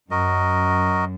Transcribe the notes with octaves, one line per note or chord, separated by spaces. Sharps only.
F#2 F#4 A#4 D#5